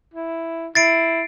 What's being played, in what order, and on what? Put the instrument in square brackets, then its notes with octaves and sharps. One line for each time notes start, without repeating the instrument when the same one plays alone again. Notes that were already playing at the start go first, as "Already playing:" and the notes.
[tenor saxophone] E4
[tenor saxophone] E4 [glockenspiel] A6 C7 D7